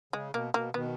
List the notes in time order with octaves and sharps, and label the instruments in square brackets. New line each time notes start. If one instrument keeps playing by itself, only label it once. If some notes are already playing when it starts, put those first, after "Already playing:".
[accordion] C#3 [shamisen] G#3
[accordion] B2 [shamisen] A#3
[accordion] B2 [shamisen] A#3
[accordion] B2 D#3 [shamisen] B3